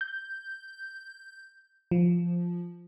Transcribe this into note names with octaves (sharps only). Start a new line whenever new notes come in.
G6
F3